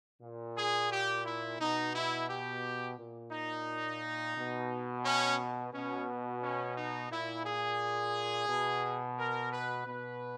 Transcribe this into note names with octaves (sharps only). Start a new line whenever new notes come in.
A#2
G#4
G4
E4
B2 D#4
E4
G4
A#2
D#4
B2
C#4
B2 C#4
C#4
D#4
A#2 E4
G#4
B2
A#4
B4
B2 B4